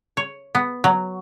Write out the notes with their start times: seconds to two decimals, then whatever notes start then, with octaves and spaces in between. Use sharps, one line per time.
0.17 C#5
0.55 B3
0.84 F#3